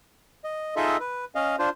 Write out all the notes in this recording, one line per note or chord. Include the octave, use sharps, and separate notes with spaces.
D#5
D#4 F4 G#4 A4 D#5 E5
B4
C#4 D#5 F5
D4 F4 C5